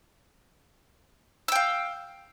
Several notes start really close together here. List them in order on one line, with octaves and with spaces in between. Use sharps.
E6 G5 F5